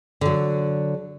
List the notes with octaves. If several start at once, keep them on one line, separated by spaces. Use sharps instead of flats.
D3 F#3